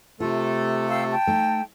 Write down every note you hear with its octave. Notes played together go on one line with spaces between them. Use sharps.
C3 A3 F4 A4
G4 F5 E6
G5 A5
A3 D#4